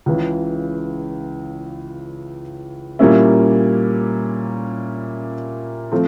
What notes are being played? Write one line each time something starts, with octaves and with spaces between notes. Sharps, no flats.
C#2 C#3 E3
A#2 G3 A#3 C#4 E4
F3 A3 C4